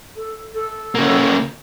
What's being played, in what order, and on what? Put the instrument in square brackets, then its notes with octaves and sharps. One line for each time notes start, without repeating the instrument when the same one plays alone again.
[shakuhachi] A4
A4
[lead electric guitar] C#3 A#3